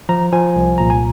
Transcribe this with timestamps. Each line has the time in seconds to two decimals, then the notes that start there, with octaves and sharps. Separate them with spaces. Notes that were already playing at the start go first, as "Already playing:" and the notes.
0.09 F3 A#5
0.33 F3 G#5
0.56 C2
0.78 A#2 A#5
0.90 G#5